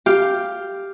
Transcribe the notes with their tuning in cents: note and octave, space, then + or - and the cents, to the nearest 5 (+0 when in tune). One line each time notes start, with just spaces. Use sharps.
G4 +0 F5 +0